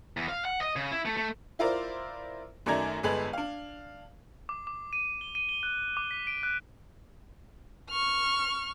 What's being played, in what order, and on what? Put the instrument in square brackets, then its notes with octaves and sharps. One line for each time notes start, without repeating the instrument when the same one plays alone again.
[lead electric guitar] E2
F5
F#5
D#5
C#3
E4
A3
A3
[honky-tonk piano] E4 F4 A#4 C5 D5
F#2 D#3 A3 D5 A#5 G#6
G1 G#3 G#4 A4 B4 F#7
D4 F5
[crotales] D6
D6
D#7
G7
D#7
G7
F#6
D6
B6
D7
F#6
[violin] C#6 F6